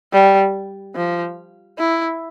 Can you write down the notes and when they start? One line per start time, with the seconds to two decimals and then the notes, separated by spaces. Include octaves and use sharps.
0.13 G3
0.95 F3
1.79 E4